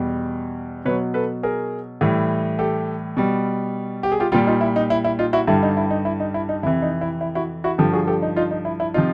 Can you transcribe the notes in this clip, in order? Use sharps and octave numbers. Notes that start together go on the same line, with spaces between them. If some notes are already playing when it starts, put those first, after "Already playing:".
Already playing: E2 B2 G3
B2 F#3 B4 C#5
A4 B4
G#4 A#4
A2 E3 G3
G4 A4
B2 G3
G4
G#4
F4 G4
A#2 G3 F4 G4
D#4 F4
E4
D#4
E4
E4
D#4 F4
E4 F#4
G2 D3 G3 E4
D#4
E4
D#4
E4
D#4
E4
D#4
F2 C3 E3 E4
D#4
E4
E4
E4 F#4
E4 F#4
G2 D3 F3 G4 A4
F#4 G#4
G4 A4
D#4
D#4 F4
D#4
E4
E4
C3 F3 D#4 F4